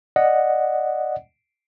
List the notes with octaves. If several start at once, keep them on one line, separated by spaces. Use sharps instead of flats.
D5 D#5 F#5